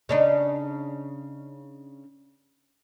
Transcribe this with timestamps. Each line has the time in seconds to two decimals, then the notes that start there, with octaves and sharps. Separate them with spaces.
0.09 C#3 D4 D#4